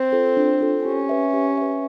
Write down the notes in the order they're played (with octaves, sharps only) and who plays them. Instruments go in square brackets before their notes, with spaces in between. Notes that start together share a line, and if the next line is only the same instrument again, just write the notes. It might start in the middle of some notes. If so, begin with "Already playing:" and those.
Already playing: [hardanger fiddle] C4
[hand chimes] F4 A4
D4
F4 A4
[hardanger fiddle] C#4 [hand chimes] G4
[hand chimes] B4 E5
G4
B4 E5